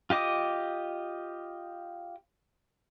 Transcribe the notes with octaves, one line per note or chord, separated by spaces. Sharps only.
F4 G4 D#5 D6 D#6